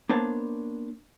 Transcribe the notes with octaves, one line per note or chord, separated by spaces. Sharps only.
A#3 B3 D4 C5 C#5 A5